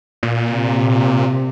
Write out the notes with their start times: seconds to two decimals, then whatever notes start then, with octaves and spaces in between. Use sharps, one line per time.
0.23 A#2
0.52 C3